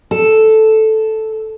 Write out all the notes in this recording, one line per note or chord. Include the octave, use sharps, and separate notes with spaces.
A4